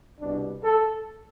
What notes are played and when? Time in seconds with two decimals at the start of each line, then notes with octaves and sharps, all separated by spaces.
0.20 C2 B2 G3 D4
0.63 A4